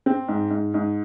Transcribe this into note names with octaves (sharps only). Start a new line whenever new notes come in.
C4
G#2
G#2
G#2